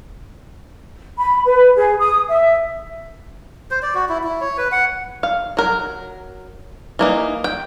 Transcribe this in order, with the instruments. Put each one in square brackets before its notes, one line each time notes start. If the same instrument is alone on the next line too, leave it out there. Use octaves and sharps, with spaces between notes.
[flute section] B5
B4
G#4
D#6
E5
[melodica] C5
D5
F#4
E4
E4
C#5
B4
F#5
[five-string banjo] F5
F#3 A#4
E3 A#3 D#4
G5